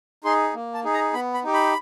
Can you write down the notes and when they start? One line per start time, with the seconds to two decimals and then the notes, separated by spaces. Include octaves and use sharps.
0.24 D#4 G#4 C6
0.54 A#3
0.74 A5
0.84 D#4 G#4
0.94 A#5
1.14 B3 B5
1.34 B5
1.44 D#4 G4
1.54 B5